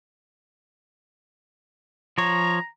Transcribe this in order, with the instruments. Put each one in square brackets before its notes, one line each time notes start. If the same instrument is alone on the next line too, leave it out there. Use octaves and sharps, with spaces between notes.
[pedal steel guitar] F3 C#5 [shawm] A#5